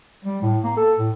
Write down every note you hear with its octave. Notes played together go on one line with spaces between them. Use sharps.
G3
A2
A#3
A4
A2